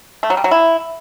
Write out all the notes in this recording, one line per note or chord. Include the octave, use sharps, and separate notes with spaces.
A3
F#3
G3
F#3
E4